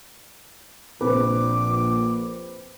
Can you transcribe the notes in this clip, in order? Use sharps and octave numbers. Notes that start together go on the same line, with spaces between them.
A#1 C4 B4 D6